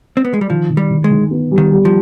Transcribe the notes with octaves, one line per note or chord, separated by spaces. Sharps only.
C4
B3
G#3
G3
D#3 F3
D#3
G3
D#3
G#3
D#3
B3
G3
D#3
G3
F3